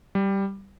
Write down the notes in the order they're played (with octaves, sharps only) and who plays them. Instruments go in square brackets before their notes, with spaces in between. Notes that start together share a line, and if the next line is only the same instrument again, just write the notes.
[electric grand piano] G3